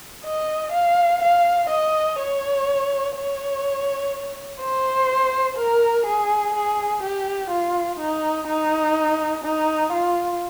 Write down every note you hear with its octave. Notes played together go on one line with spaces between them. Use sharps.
D#5
F5
F5
D#5
C#5
C#5
C5
A#4
G#4
G#4
G4
F4
D#4
D#4
D#4
F4